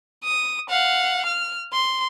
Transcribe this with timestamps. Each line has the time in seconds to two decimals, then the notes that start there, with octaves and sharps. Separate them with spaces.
0.25 D#6
0.70 F5 F#5
1.26 F6
1.73 C6